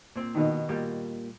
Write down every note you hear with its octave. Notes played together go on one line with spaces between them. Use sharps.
A#2 C4
B2 D#3
A#2 G3 A#3